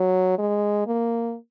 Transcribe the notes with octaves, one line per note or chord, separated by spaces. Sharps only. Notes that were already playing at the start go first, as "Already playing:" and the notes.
Already playing: F#3
G#3
A#3